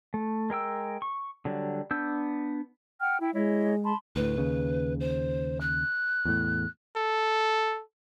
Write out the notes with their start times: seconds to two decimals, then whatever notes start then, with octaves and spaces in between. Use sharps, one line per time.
0.14 A3
0.50 G#3 A#4 G5 E6
1.02 C#6
1.45 D3 F#3 G3
1.91 B3 D4 E6 G6
3.00 F#5 G5 F6
3.21 E4 E5 G5
3.34 G#3 E4 C#5 D#5
3.83 A5 B5 C6
4.16 D2 A2 B4
4.38 D#2 C#3
5.00 C5
5.60 F#6
6.25 E2 A2
6.96 A4